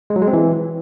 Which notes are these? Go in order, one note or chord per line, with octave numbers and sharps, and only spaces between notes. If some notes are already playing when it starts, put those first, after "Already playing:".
G#3
F#3
G#3
C4
E3